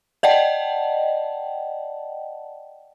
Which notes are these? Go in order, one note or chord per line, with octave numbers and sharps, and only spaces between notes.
D5 D#5 F#5 G5 A5